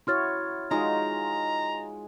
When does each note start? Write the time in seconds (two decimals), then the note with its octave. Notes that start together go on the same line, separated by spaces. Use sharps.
0.07 E4 F#4 C#5 C6 F6 A6
0.71 G#3 D#4 F4 F#4 A#5